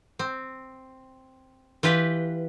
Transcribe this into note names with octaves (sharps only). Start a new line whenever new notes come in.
C4
E3 F4 G4 B4